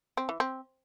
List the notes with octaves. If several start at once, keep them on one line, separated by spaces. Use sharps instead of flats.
C4
E3
C4